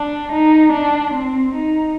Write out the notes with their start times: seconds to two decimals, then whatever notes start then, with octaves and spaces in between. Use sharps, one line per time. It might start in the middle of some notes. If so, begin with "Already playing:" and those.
Already playing: D4
0.32 D#4
0.72 D4
1.13 C4
1.55 D#4